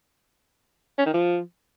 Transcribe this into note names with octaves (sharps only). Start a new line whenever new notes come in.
C#4
D#3
F3